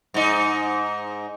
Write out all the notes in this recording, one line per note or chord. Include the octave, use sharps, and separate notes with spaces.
G#2 D#4